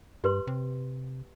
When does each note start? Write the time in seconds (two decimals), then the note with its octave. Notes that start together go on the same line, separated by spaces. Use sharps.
0.24 G2 G4 B4 C6
0.47 C3